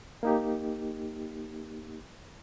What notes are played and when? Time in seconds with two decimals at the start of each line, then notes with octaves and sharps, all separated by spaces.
0.23 A#3 D#4 G4